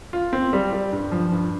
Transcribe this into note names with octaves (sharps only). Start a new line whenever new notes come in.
F4
C4
G3
G3
G2
F3
G2